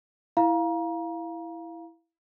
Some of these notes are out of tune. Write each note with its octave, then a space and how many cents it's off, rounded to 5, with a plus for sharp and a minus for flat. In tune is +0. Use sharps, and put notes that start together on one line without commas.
E4 +0 F5 +0 A#5 +30